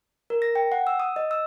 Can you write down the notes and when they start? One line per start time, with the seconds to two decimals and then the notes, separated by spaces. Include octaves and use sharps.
0.30 A#4
0.42 A#6
0.55 G5
0.72 F#5
0.87 E6
1.00 D#6
1.16 D#5
1.31 E6